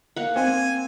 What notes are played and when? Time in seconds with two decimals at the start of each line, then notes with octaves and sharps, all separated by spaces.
0.16 A#3 F#5
0.36 C4 G#5